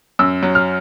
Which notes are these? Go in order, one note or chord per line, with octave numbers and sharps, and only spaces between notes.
F#2 E6
F#3
F6